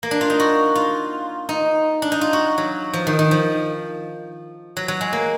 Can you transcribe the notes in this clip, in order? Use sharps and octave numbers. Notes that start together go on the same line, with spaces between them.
A#3
D4
F4
D#4
F#4
F4
D#4
D4
D#4
F4
F#4
F#3
F3
D#3
D#3
F3
F#3
F#3
G#3
A#3